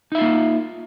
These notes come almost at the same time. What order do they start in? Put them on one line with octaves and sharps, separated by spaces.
D#4 E5 F4 A#3